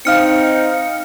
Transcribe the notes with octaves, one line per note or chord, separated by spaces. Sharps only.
C4 D#4 F5 F6 C#7